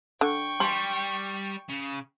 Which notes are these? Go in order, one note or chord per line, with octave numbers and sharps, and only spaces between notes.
D3 G5 C#6
G3 C6
C#3